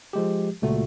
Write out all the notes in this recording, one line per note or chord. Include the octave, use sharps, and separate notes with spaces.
F3 G#3 G4
C#2 A#2 A3 F#4